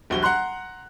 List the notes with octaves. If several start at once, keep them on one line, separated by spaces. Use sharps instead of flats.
D#1 A#1 F#4 G7
F#5 A#5 C6 F#6